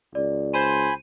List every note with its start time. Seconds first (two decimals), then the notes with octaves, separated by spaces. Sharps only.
0.15 C#2 D5
0.54 C5 G#5 B5 D#7